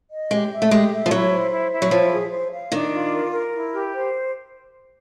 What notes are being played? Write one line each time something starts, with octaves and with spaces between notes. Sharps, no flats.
D#5
G#3 G4
E5
A3
G#3 G4
E5
F3
F#3 E4
C5
E4
E4
F#3
F3 C5
G#4
C5
F5
D#3 D4
F4
A#4
A#4
E4
G4
C5